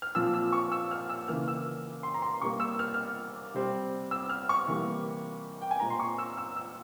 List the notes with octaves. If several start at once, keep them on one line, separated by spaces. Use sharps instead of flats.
F6
A#2 F3 C4 E6
E6
C#6
E6
F6
E6
C#3 E3 A#3 F6
E6
C6
A#5
C6
C3 G3 A#3 C#6
E6
F6
F6
C3 G3 C4
E6
F6
C#6
C3 E3 G3 A#3
G5
G#5
A#2 G#3 C4 A#5
C6
C#6
E6
E6
E6